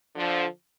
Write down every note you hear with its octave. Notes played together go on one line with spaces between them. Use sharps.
D3 F3